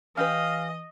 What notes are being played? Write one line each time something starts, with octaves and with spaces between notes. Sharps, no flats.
E3 C#4 G4 B4 D#5 F5